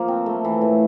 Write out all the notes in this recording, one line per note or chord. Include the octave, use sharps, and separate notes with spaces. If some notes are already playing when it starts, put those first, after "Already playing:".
Already playing: F3 A#3
C4
A3
E3
A2